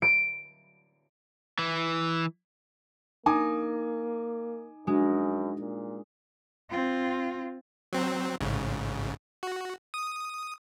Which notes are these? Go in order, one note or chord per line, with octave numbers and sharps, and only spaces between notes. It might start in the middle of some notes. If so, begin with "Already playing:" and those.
D7
E3
A#3 D#4 G#5 D6
F#2 G#3 D4 F#4
A#2
C4 F4
F#3 C4
A1 G#2 C#3
F#4
D#6